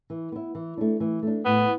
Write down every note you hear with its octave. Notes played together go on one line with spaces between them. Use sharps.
E3
B3 E4
E3
A3 D4
E3
A3 D4
A2 B3